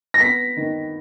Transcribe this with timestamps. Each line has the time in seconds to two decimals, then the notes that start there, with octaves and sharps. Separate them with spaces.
0.14 A#6
0.20 B3 B6
0.57 D#3